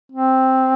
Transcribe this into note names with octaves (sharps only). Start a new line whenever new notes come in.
C4